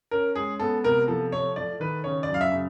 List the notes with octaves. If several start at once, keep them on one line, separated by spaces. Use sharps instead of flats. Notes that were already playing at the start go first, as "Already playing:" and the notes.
C#4 A#4
G#3 G#4
B3 A4
C3 A#4
F3 A4
A3 C#5
A3 D5
D#3 B4
C#3 C#5
D5
F#2
F5
E5
C#3